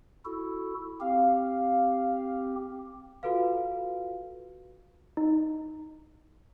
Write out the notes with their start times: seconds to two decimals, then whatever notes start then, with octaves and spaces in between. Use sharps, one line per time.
0.25 E4 F#4 A4
1.00 C4 G4 F5
3.23 F4 F#4 A4 B4 F5
5.17 D#4